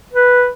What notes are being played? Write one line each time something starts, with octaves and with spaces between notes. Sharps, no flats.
B4